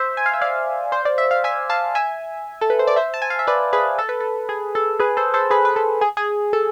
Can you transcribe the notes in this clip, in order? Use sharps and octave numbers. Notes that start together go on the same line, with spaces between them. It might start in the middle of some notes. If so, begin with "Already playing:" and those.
Already playing: C5 E5
G#5
F5
E5
D5 F5
C5
D5
E5
F5
E5 G#5
F5 A5
E5 G#5
A4
B4
C5
D5
C5 E5
A5
G#5
F5
E5
B4 D5
G#4 B4
A4
B4
A4
G#4
A4
G#4 B4
A4 C5
A4 C5
G#4 B4
B4
A4
G#4
G#4
A4